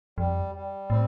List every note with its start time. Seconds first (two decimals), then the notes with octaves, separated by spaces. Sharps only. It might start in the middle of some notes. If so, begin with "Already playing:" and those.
0.18 F2 G3
0.55 G3
0.90 A2 C4